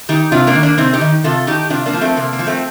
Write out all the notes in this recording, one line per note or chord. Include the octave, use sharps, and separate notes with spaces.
D#3 D#4 G4
C3 D4 F4
A#3 D4
D#3
A#3 D4
C3 C4 D#4
D#4 G4
D#3
C3 F4 A4
D#3 D#4 G4
C3 D4 F4
A#3 D4
F3
A3 C4
C3 A#3
A#3
F3
A3 C4